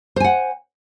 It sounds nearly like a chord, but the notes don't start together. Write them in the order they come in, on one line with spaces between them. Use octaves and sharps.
C5 G#5 F#5